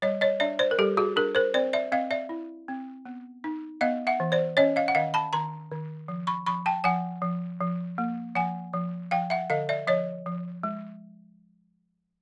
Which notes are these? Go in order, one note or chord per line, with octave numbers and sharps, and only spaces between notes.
G3 C#5 D#5
C#5 D#5
D4 D5 E5
C5 D5
A#4
G3 G4 A4
F#4 G#4
D4 G#4 A#4
A#4 C5
C4 C5 D5
D5 E5
C4 D#5 F5
D5 E5
E4
C4
B3
D#4
B3 D#5 F5
E5 F#5
E3
C5 D5
C#4 C#5 D#5
D#5 F5
F#5
D#3 D#5 F5
A5 B5
D#3 A#5 C6
D#3
F3
B5 C#6
F3 B5 C#6
G5 A5
F3 F#5 G#5
F3
F3
A#3
F3 F#5 G#5
F3
F3 F5 G5
E5 F#5
D3 D#5 F5
D5 E5
F3 C#5 D#5
F3
G#3